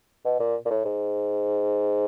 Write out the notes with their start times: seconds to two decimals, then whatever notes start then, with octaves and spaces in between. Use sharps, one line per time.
0.25 B2
0.40 A#2
0.65 A#2
0.71 A2
0.85 G#2